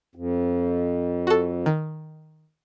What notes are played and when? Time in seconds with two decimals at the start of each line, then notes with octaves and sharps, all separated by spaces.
0.15 F2
1.27 F#4 A4
1.66 D#3